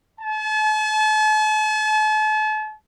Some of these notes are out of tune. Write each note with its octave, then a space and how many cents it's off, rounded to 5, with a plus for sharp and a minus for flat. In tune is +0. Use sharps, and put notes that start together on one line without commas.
A5 -40